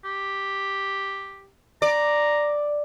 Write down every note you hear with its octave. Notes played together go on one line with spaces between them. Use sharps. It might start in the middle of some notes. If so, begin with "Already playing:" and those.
G4
D5 A#5